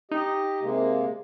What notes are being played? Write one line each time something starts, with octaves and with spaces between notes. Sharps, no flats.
D#4 G4 D#5
C3 G#3 A#3